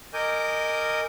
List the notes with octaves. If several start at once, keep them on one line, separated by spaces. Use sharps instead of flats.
A#4 D#5 G#5 D6 G6